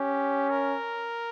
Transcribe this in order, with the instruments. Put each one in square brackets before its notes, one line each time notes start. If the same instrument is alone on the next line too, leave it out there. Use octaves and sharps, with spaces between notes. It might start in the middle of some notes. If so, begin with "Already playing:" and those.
Already playing: [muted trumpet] C#4 [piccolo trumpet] G4
[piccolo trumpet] A#4